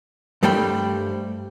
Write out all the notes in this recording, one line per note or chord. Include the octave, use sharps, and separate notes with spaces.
G2 G3 A3 C5 G5 B5